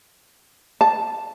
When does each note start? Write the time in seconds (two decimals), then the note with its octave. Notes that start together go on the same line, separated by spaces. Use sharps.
0.81 A5